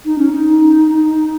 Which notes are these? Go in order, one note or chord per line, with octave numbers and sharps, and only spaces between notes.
D#4
C#4
D#4